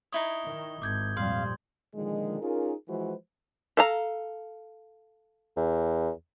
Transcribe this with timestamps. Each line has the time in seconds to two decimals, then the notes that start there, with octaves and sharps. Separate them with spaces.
0.12 D#4 E4 C#5 D#6 G7
0.46 D#3
0.82 G#1 D6 G6 G#6
1.17 F2 A#2 G3 F5 C6
1.95 A#2 D3 D#3 F3 G#3
2.41 C#4 D#4 F4 G#4 A#4
2.87 E3 F3 G#3 F#4 B4 C5
3.77 A4 F5 A#5
5.57 E2